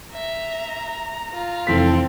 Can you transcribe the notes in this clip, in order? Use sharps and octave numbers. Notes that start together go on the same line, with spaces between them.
E5 A#5
F4
F1 E3 C4 A4 B6